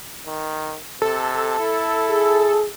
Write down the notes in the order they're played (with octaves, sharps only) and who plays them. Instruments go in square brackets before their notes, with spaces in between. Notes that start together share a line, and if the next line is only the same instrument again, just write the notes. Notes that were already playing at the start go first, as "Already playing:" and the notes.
[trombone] D#3
[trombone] C3 [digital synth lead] A4
[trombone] E4
[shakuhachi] G#4